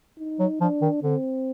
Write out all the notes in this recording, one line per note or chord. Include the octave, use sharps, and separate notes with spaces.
D#4
F#3
F3 D4
D#3
D3 C4